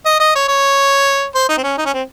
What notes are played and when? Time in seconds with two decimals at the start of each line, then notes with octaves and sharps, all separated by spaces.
0.06 D#5
0.20 D#5
0.35 C#5
0.48 C#5
1.35 C5
1.49 D#4
1.57 C4
1.63 C#4
1.78 D#4
1.85 C#4
1.93 C4